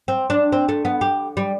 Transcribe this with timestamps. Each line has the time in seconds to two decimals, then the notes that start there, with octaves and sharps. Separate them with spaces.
0.08 C4
0.30 D4
0.52 C4
0.69 A3
0.85 B3
1.01 G4
1.37 G3